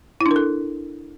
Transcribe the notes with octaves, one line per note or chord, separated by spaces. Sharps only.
E4
D4
A#4
A4